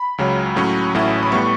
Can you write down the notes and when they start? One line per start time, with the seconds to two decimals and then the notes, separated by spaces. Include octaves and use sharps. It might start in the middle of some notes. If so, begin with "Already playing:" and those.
Already playing: B5
0.18 C#2 C#3 F#3
0.56 A2 F#3 C#4
0.95 A1 A2 F#3 C#4 E4
1.23 B5
1.32 A2 G3 B3 C#6